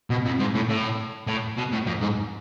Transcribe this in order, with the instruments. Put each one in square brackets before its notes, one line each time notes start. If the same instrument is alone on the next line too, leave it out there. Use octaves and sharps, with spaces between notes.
[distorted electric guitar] B2
F2
G#2
A2
A2
A2
B2
A2
F2
G#2